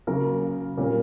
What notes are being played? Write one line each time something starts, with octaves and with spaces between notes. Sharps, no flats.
C#3 F#3 A#3 A#4
A#2 G3 A#3 C#4